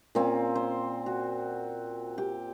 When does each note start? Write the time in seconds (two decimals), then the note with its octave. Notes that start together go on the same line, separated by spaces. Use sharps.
0.15 A#2 C4 C#4
0.55 C5
1.06 F#4
2.18 G4